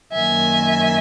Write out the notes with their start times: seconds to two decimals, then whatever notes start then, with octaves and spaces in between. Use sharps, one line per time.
0.12 F#2 D#3 A#3 E5 G#5